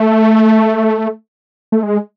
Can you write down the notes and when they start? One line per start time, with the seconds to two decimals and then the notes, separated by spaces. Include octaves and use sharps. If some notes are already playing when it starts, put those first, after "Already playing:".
Already playing: A3
1.72 A3
1.83 G#3